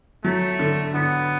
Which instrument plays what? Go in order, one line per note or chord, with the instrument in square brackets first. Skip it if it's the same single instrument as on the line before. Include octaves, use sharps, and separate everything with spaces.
[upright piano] F#3 [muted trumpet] A3
[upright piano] D3
[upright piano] D3 [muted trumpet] B3